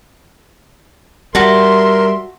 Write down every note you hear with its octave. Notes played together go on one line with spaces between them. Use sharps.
G3 F#4 A#4 E5 A5 C6